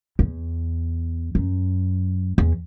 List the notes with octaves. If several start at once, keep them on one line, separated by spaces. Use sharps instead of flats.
E2
F#2
E2